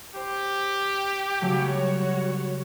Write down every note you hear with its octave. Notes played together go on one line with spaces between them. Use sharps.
G4 C5
C#3 F#3 G3 A3 F#4 C#5